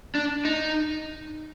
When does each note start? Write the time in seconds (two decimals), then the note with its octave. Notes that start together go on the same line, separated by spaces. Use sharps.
0.15 D4
0.45 D#4